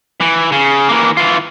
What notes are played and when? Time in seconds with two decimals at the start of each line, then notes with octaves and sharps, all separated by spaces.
0.21 E3
0.52 C#3
0.89 E3 A#3
1.17 E3 F4